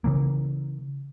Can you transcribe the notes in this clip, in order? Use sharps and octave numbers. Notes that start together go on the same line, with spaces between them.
C#3 E3 A#3